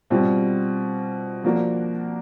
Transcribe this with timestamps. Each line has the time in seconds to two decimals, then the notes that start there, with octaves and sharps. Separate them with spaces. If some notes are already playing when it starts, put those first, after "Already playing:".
0.10 B2 G3 C4 F4
1.44 F3 A#3 D4 F#4 A#4